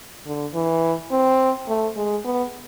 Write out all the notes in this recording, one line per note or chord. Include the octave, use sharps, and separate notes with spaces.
D3
E3
C4
A3
G#3
B3